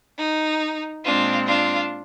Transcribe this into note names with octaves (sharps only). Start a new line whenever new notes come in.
D#4
A#2 G#3 C4 D4 F4
D4 F4